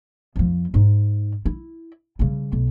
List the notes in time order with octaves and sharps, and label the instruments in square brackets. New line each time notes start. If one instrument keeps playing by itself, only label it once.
[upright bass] F2 F3
G#2 D#4
E4
C#3 G3
B1